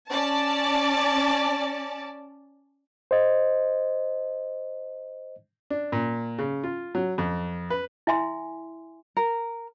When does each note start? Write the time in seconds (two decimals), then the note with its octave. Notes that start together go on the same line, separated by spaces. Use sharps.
0.11 C#4 D5 A5
3.11 C5 D#5
5.70 D4
5.92 A#2
6.39 C#3
6.64 F4
6.95 F#3
7.18 F2
7.70 B4
8.07 E4 E5 G#5 C6
9.17 A#4